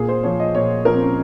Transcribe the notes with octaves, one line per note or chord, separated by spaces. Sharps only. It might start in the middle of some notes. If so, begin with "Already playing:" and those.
Already playing: A#2 G#4
C5
F3 C#5
D#5
A#2 C#5
F3 A#4
C4
C#4